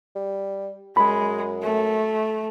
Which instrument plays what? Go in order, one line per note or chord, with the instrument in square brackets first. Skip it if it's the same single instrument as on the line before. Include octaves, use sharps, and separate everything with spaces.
[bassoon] G3
[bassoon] F#2 [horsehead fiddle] G#3 [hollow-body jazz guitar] B5
[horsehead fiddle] A3